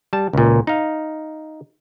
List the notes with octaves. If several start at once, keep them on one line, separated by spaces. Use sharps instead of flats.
G3 A5
C#2 A#2
D#4 F5